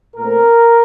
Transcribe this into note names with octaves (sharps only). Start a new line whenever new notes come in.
A#2 A3 C4 A#4